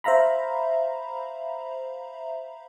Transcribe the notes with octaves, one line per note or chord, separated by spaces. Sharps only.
C5 E5 F5 A#5 B5